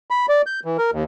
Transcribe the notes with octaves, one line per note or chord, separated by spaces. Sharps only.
B5
D5
G6
E3
A#4
D#2